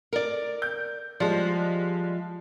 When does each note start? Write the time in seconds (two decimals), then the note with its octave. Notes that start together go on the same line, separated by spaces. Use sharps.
0.13 A#4 D5
0.62 G6
1.20 F3 G3 G#3